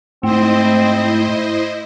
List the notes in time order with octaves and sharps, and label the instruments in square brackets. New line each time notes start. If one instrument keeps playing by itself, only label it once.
[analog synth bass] G#2 [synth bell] A3 [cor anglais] C4 [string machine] E4 C5 D#5